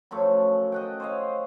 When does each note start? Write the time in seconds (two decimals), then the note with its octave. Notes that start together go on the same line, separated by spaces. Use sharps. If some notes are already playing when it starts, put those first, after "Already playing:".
0.11 F#2 F3 A3 C#4
0.72 D#5 F#5 G5
1.00 C5 C#5 D#5 F5